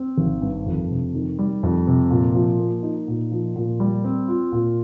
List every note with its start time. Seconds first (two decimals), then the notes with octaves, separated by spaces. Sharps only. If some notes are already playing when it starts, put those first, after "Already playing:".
Already playing: C4
0.18 G#1
0.42 G2
0.66 F2
0.90 C3
1.14 D#3
1.39 G3
1.63 F2
1.87 C3
2.11 A#2
2.35 F3
2.59 A#3
2.83 D#4
3.08 A#2
3.32 F3
3.56 A#2
3.80 G3
4.04 C4
4.28 F4
4.52 A#2